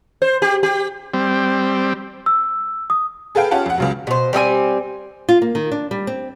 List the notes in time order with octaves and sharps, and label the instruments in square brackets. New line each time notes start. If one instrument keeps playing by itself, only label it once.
[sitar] C5
G4
G4
[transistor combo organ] G3 C4
[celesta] E6
D#6
[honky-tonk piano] G#4 A4 B4 F5 G5
C#4 F4 G4 F5 F#5 A5
F2 F#5
C#2 C#3 F#3
[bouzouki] B2 C5
G3 C4 D#4 G#5
[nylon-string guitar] F4
A#3
D#3
D4
G3
C4